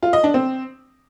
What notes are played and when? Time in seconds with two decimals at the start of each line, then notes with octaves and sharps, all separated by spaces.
0.03 F4
0.13 D#5
0.24 D4
0.34 C4